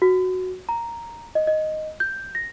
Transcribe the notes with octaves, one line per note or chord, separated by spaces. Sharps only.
F#4
A#5
D#5
D#5
G6
A#6